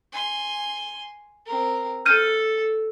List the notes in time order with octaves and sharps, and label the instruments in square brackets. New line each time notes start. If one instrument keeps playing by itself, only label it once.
[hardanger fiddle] G#5 C6
C4 A#4
[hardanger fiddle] A4 [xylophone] F6 G6 D#7